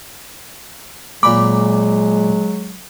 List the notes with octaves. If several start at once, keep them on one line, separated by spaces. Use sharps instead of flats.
A#2 F#3 G#3 B5 D6